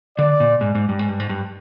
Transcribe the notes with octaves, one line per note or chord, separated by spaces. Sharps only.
D3 D5
A#2
G#2
G#2
G2
G#2
G2
G#2
G2